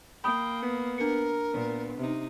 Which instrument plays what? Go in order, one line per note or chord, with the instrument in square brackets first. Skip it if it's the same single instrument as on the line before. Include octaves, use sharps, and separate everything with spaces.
[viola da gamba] A#3 [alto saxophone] G5 [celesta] B5 D#6
[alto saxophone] B3
[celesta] D4 C#7 [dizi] A#4
[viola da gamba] A#2 [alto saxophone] B3
[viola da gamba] C3 D#4